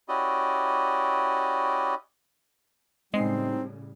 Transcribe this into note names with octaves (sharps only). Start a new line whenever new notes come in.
C#4 E4 F#4 G4 D5 D#5
A2 C#3 G3 G#3 C4 D#4 C7